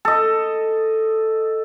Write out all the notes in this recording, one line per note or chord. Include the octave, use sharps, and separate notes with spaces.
A4 D#5